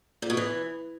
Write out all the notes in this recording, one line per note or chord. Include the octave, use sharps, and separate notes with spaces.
A#2
B2
E3